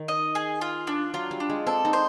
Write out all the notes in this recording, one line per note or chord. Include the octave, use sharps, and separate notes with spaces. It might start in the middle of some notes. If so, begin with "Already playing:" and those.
Already playing: D#3
D#5
G#4
F4
D4
F#3 F4
G3
D4
G#3
C4 A4
D#4
C5